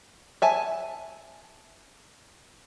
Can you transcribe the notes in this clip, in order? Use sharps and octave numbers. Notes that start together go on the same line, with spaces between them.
E5 G#5 A5